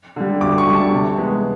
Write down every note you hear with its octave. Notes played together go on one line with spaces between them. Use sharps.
D3 G3
D2 D6
C#6
D3 G3
A5
C3
E3 G#3 B3